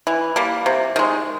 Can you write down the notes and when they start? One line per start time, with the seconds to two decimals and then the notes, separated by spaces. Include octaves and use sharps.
0.07 E3
0.36 G3 A#3
0.66 C3
0.96 D#3 G#3